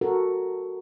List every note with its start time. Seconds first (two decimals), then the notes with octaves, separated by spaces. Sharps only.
0.01 F#4 A4 A#4